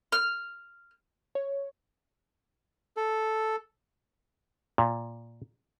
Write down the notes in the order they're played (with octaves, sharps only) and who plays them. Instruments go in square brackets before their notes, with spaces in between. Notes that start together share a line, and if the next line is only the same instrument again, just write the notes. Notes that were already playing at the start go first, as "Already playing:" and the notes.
[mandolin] F6
[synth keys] C#5
[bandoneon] A4
[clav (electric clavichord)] A#2